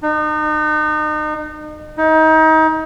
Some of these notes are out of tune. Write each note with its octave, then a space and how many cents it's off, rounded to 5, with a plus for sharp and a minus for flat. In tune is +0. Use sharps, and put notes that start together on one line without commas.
D#4 -35
D#4 +30